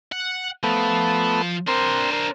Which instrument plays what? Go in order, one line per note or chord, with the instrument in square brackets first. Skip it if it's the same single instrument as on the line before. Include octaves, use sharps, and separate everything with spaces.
[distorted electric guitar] F#5
[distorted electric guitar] F3 [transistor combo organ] A3 B3
[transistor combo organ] C4 A#4 [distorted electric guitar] D4 C5
[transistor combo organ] A#4